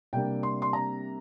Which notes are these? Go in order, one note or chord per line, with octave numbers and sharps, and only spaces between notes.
C3 G3 A#3 D4 G5
C6
C6
A#5